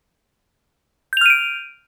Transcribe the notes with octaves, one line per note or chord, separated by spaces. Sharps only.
F6 G6 D7 D#7 F7